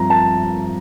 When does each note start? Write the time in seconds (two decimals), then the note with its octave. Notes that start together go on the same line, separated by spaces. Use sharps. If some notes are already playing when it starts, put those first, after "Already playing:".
Already playing: G2 F3 C4 A#5
0.10 A5